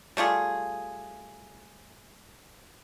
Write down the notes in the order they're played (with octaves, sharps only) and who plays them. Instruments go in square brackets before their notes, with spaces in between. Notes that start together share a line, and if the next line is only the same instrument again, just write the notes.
[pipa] G3 A3 F4 G#4